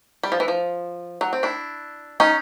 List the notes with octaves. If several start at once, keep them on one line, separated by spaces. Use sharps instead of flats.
G3
F3
E3
F3
F#3
C4
D4 E4
C#4 D#4